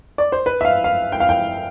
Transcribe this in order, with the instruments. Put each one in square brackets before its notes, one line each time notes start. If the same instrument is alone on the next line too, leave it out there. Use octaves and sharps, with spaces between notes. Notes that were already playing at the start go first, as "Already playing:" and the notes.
[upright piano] D5
C5
B4
E5
F5
F5
G5
F5
G5